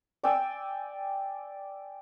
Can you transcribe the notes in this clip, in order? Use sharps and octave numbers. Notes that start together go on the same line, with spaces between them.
D5 G5 G#5 E6